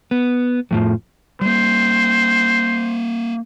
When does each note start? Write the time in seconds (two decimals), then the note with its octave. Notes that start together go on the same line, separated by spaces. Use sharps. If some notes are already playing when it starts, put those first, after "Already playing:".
0.11 B3
0.71 F2 A2 F3
1.41 G3 A#3 C5